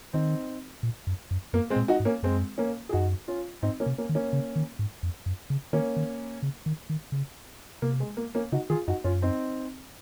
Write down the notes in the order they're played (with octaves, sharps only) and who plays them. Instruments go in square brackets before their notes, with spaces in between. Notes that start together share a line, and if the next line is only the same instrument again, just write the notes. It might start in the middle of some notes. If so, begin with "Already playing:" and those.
[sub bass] D#3 [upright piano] C4 D#4
[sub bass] A#2
F#2
F#2
[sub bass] F#2 [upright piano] A#3
[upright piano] G#3 C4
[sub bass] A#2
[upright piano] D#4 F#4
[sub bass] G#2
[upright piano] A#3 C#4
[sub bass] F#2 [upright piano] G#3 C4
[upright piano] A#3 C#4
G#4
[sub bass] F#2 [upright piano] D#4 F#4
[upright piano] C#4 F4
[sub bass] G#2 [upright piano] C4 D#4
[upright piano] A#3 C#4
[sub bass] C3
[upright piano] A#3 C#4
[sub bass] D#3
[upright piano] A#3 C#4
[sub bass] C#3
D#3
G#2
F2
F#2
C#3
[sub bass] D#3 [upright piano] A#3 C#4
[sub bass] D#3
C#3
D#3
D#3
C#3
[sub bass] C3 [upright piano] A#3
[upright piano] G#3
A#3
A#3 C#4
[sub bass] C#3 [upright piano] D#4 F#4
[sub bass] D#3 [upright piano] F4 G#4
[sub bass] F#2 [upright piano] D#4 F#4
[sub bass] F#2 [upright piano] C#4 F4
[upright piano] C4 D#4